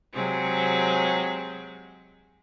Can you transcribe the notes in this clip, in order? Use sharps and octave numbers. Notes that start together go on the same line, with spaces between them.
C3 F#3 G#3 C4 G#4